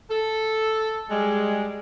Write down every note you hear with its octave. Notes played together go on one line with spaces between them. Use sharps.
A4
G3 G#3